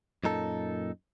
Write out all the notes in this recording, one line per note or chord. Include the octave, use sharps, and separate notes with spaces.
F#2 A#2 D#4 A4